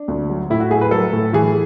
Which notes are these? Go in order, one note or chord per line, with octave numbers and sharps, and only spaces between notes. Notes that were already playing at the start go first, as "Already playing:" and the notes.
Already playing: D4
D2
F#3
A2 E4
F#4
A3 G#4
B4
F#3 A4
A2
E3 G#4